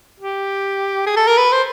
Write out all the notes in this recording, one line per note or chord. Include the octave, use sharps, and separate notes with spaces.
G4
G#4
A4
A#4
B4
C5